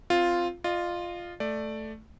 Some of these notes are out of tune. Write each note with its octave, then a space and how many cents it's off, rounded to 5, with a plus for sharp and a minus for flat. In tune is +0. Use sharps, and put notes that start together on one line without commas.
C4 +0 F4 +0
F4 +0 D#5 -35
A3 +0 D5 +10